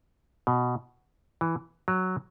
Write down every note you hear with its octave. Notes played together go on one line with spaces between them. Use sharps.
B2
E3
F#3